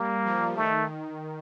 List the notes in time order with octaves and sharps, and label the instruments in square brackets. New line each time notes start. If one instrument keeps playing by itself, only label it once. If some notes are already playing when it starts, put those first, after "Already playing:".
Already playing: [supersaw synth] G3 [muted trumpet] A#3
[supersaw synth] F3
[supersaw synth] D#3 [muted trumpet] A3